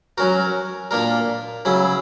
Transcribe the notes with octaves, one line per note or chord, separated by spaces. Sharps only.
F#3 C#4 F#4 A#4
A#2 A#3 D4 A#4
C#3 F#3 C#4 E4